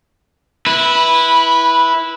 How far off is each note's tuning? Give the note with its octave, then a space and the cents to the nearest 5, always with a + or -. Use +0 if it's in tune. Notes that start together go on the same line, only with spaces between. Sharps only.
E4 -5 B4 -15